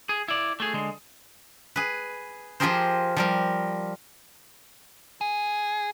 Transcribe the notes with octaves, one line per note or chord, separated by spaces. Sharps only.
G#4
E4 D5
A3 G#4
D3 G#3
G#4 B4
F3 F4 G4 G#4 A#4 C5
F3 G3 A#4
G#4